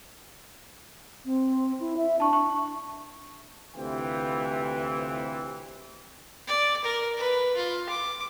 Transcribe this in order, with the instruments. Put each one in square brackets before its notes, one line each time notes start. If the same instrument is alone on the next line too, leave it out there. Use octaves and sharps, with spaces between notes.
[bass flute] C4
E4
E5
[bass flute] D4 [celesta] A5 C#6
[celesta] C#6
[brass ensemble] D2 C3 E3 F4 B4 G5
[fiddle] D5
A#4
B4
F4
D6